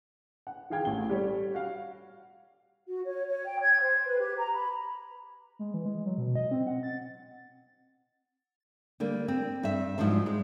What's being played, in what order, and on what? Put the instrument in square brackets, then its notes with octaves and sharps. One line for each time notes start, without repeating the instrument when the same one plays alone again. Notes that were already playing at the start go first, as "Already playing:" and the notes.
[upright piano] F#5
D#3 E3 G#4 F5 G5 G#6
A1 A2 G7
G3 G4 A4 C#5
F#4 F5
[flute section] F#4
C#5
C#5
G5
G#6
C5
B4
G4
A#5
B5
[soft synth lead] G#3
E3
G#3
F#3
B2
D#5
C4
F#5
A6
[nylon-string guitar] D3 G3 A#3
C4
G2 E5
G#2 F3 F#3 D4 C5
G#3